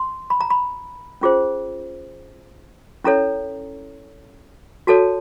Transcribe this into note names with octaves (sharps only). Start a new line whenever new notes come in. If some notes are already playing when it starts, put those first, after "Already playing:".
Already playing: C6
B5
A#5
B5
C#4 F4 G#4 C5
C#4 E4 A4 C#5 A#5
F#4 A4 C#5 A5